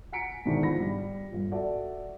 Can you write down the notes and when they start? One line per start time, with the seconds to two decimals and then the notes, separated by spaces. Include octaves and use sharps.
0.12 F#5 G#5 A#5 B6 C#7 D7
0.45 G#2 B2 D3 D#3 D4 E4
0.63 C#2 G#2 F3 F4 B5 A#6
0.80 G3
1.31 G1 A#2
1.52 F#4 A4 D5 E5 A5